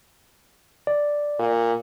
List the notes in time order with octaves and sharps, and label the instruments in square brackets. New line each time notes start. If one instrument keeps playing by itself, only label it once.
[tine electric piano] D5
[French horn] A#2